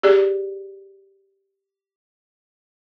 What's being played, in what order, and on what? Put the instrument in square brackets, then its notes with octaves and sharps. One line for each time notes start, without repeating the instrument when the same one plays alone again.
[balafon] G4 G#4 D5